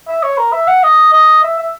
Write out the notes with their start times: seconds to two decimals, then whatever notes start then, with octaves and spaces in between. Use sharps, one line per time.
0.08 E5
0.23 C#5
0.38 A#4
0.52 E5
0.68 F#5
0.83 D#5
1.13 D#5
1.44 E5
1.59 E5